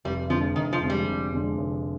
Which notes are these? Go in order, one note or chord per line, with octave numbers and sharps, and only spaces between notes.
F1 G3
F2 D3 F3 G#3
F1 D#3
F3
F2 D3 G#3
G3
F1
F2 D3 G#3
F1